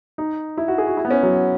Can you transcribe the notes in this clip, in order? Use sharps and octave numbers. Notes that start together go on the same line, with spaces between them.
D#4
E4
F#4
G#4
F#4
E4
B3
C#4
F#3